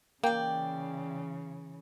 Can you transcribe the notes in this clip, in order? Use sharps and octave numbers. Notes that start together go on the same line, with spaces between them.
C#3 E3 A#3 D5 G5